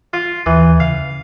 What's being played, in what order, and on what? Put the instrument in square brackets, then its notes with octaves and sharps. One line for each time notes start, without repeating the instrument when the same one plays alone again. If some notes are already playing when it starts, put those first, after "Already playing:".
[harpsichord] F4
[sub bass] D#2 [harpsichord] E3
[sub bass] C#3 [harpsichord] F5